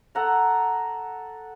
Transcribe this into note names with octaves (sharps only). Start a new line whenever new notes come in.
A4 F#5 A#5